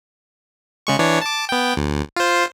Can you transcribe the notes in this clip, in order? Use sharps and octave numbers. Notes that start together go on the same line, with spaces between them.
C#3 G#3 C#6
E3 D4 C#5
A5 D6
B3 G5
D2
F4 C5